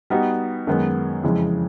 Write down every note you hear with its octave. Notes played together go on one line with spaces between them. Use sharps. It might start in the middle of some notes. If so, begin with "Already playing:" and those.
G3 B3 D#4 F#4
F#2 D#3 G#3 B3
F2 C#3 E3 G#3